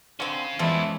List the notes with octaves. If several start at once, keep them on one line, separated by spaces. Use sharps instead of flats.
D3 C4 C#4 F5
E2 C#3 E3 F3 G#3 A3 C#4 E4